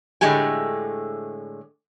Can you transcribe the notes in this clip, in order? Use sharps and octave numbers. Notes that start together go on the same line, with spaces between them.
A2 D3 G#3 A3 G4 G#5